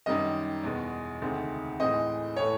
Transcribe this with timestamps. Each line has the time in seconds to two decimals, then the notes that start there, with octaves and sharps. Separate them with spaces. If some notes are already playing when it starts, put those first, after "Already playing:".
0.06 F#2 D#3 G3 D#5
0.64 E2 B2 G#3
1.22 D2 C3 D#3 G#3 C4
1.80 A2 E3 G#3 C4 D#5
2.36 A2 E3 A3 C#5